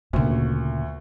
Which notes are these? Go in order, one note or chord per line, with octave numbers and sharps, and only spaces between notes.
D2 A#2 C#3